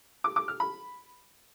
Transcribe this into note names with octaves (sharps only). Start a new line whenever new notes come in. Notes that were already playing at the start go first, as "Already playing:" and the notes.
D6
D6
F6
B5